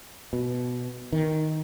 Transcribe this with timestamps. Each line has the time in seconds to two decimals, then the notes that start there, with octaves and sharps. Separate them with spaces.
0.33 B2
1.12 D#3